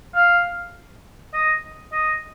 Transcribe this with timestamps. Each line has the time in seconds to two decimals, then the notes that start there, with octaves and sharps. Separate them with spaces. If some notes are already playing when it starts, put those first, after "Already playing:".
0.15 F5
1.34 D#5
1.93 D#5